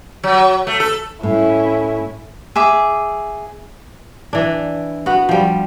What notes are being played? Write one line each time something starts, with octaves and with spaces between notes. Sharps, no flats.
F#3
A3
A4
A2 C#4 E4
G#4 E5 D6
E3 D4
B3 F#4 F#5
F3 G3